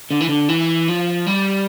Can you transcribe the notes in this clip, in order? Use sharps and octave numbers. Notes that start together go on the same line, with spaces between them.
D3
E3
D3
E3
F3
G3